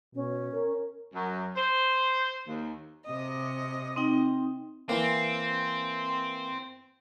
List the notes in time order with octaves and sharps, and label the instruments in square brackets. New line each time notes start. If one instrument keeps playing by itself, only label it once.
[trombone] B2 [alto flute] C#4
[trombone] A#4
[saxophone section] F#2
C5
D#2
[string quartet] C3 D#5
[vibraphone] C4 D#4 G5
[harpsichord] E3 A#3 [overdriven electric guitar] C4